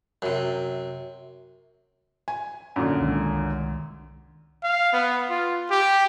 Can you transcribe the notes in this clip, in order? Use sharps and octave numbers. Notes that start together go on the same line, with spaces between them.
F#2 C3
G#5
F#2 A#2 D3
C2 D#3 G#3
F5
B3
F4
G4